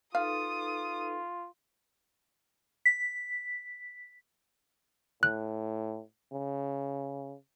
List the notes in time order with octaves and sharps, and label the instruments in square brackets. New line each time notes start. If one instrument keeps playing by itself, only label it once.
[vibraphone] D#4 A4 B4 [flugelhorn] F4 [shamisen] F5 [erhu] D#6
[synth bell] B6
[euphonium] A2 [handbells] F#6
[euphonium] C#3